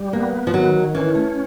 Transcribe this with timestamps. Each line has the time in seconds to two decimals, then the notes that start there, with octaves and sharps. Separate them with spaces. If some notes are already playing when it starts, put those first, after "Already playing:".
Already playing: G3
0.13 A#3 B3
0.47 F3
0.54 D#3 F#3
0.95 E3 C#4
1.15 A3